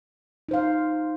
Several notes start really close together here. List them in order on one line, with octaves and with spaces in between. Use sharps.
D#4 C5 F5